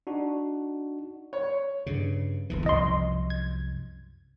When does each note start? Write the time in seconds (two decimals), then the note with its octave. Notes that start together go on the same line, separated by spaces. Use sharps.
0.07 D4 D#4 F#4
1.33 C#5
1.86 G2 C#3
2.50 D#1 E2 E3
2.66 C2 F#2 F3 D#5 C6
3.30 G#6